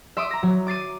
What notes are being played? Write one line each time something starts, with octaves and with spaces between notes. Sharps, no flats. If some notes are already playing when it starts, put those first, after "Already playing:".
E5 C6 D6 D#6
A#5 A#6
F#3
D6 A6 C7 D#7